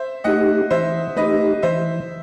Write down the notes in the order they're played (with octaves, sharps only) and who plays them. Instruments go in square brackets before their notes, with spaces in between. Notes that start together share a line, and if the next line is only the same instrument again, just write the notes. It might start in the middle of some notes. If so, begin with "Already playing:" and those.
Already playing: [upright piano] C5 E5
[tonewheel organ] A3 D#4 G4 [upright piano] D#5 F#5
[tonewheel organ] E3 [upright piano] C5 E5
[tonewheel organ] A3 D#4 G4 [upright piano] B4 D#5
[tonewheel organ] E3 [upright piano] C5 E5